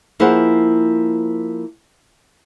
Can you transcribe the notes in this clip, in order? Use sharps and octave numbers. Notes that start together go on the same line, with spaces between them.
F3 A#3 E4 G#4 C5 F#5